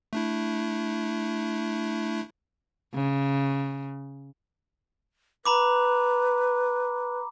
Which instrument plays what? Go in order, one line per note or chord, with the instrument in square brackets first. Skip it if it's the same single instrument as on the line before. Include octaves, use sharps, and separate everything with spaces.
[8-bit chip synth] A3 D4 E4
[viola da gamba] C#3
[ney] B4 [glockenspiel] A#5 B5 D6